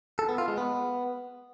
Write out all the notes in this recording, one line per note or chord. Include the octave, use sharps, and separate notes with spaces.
A4
B3
F4
G#3
B3